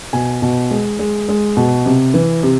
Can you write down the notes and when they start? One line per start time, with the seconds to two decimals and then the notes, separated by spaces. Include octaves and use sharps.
0.13 B2 G#5
0.42 B2
0.70 G#3
0.99 G#3
1.29 G#3
1.57 B2
1.86 C3
2.14 E3
2.43 C3